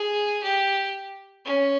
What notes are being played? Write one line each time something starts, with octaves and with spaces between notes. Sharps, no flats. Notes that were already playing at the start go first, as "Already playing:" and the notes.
Already playing: G#4
G4
C#4